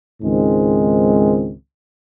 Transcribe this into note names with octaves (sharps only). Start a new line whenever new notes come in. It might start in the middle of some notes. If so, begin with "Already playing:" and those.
C#2 G#2 D#3 G#3 C4